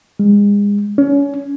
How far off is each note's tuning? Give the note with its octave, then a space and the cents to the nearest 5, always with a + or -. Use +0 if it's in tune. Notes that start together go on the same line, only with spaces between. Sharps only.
G#3 -35
C#4 +30